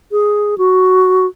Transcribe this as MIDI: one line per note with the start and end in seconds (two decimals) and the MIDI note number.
0.12 0.58 68
0.58 1.26 66